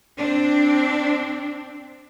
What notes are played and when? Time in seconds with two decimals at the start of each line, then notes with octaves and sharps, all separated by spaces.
0.15 C4 D4